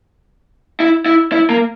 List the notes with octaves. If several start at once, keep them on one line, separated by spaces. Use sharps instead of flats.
E4
E4
E4
A#3